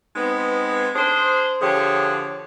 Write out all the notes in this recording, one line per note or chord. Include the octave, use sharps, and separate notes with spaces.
G#3 B3 C4 D#4 B4
D4 G#4 C5
D3 F3 G4 G#4 C#5